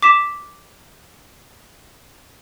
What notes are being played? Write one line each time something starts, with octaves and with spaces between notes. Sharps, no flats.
D6 B6 E7